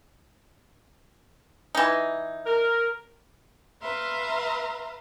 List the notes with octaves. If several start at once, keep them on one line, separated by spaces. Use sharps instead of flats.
E3 D#4
A#4
B4 E5 F5 A#5 C6